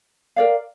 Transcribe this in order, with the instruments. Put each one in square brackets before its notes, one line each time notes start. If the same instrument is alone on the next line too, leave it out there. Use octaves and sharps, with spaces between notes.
[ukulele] A#4 D5 F5